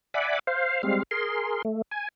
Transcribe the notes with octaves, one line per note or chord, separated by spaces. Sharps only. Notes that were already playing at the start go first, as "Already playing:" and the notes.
D5 E5 F#5 G#5 B5 D6
C5 F5
G3 G#3 C4 F5
G#4 A#4 C6
A3
G#5